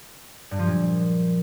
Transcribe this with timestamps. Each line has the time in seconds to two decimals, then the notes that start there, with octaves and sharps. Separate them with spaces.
0.51 G2
0.59 F3
0.67 A#2